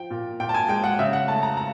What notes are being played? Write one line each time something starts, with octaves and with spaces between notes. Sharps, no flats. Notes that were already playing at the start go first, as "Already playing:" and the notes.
Already playing: F3 G5
A#2
A#2 G5
A5
G#5
G#3 G5
F#5
C#3 E5
F#5
A3 A5
A#5
A#5